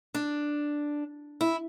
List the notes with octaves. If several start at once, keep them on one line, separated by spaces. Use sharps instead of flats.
D4
E4